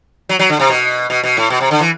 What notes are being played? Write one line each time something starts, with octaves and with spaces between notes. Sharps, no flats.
F#3
F#3
D3
C3
B2
B2
B2
A2
B2
C3
D3
E3